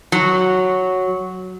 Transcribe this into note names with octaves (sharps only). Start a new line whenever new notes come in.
F#3